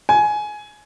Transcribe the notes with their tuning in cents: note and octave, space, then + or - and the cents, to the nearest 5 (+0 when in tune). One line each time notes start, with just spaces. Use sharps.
G#5 +15